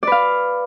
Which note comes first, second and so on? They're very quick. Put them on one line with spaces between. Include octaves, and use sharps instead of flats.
D5 B4 F5